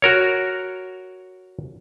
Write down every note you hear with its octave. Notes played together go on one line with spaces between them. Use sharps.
F#4 A#4 C#5